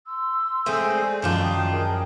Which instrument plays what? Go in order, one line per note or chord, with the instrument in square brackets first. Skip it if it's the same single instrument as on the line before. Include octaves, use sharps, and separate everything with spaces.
[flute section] C6 E6
[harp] G#3 G6 [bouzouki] A3 C4 G#4
[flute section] D5 G#5
[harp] F#2 F3 [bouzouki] D#3 D4 F4 [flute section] G6
[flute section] G5 D#6
[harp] G#4 [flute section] A#4 G5 D#6